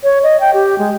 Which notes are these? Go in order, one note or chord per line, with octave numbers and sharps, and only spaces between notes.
C#5
D#5
G5
G4
G#3